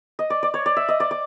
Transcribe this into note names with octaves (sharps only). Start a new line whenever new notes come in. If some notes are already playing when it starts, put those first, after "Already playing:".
D#5
D5
D5
C#5
D5
E5
D#5
D5
D5